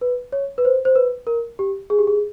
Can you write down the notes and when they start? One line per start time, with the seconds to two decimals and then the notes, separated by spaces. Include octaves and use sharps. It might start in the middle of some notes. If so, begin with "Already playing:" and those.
0.01 B4
0.32 C#5
0.58 B4
0.65 C5
0.85 C5
0.96 B4
1.27 A#4
1.59 G4
1.90 G#4
1.99 G4
2.07 G#4